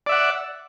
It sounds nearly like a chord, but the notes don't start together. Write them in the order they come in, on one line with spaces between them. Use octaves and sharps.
D5 E5 F#5